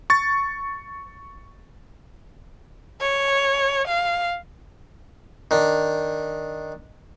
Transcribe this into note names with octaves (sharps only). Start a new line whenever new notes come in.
C#6 A6
C#5
F5
D#3 D4